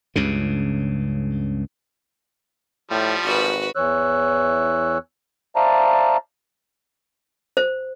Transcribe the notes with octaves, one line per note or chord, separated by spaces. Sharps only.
C#2 G2 C#3
A2 F3 G3
G#1 F#4 B4
E2 E3 C#5 E6 F#6
C5 D5 E5 F5 A5 A#5
C5